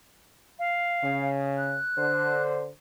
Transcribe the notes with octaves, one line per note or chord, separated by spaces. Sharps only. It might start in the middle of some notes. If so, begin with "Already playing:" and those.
F5
C#3
F#6
D3 C5